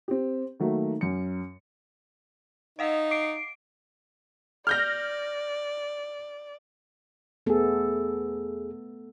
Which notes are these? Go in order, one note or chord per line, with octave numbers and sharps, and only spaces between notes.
C4 G4
D#3 F#3 A3 A#3
F#2 C#7
D#4 D#5 F5 F#5
D6 C7 D7
D5 F6 G6 A#6
E2 A3 B3 G#4 A4